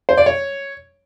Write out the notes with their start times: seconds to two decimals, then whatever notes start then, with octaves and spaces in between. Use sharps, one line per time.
0.09 C5
0.17 D5
0.26 C#5